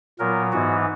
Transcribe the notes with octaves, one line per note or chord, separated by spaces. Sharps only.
A#2 F#3 B3 A#4
G#2 E3 B3 F#4